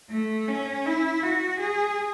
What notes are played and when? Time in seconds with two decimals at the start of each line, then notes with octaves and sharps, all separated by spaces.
0.11 A3
0.49 C#4
0.86 E4
1.23 F#4
1.60 G#4